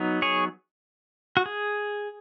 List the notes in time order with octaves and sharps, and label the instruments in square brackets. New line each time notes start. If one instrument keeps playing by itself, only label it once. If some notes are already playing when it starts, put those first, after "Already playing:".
Already playing: [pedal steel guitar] F#3 B3 D#4
G#4 C#5
F#4
G#4